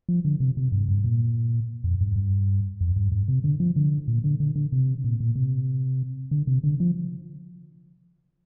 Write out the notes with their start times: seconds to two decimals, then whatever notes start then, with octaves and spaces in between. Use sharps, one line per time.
0.09 F3
0.25 D3
0.40 C3
0.57 C3
0.72 G2
0.88 G2
1.04 A#2
1.84 F2
2.01 G2
2.16 G2
2.81 F2
2.96 G2
3.12 G2
3.28 C3
3.44 D3
3.60 F3
3.76 D3
4.08 A#2
4.24 D3
4.40 D3
4.56 D3
4.72 C3
5.04 A#2
5.20 A#2
5.36 C3
6.31 D3
6.47 C3
6.64 D3
6.80 F3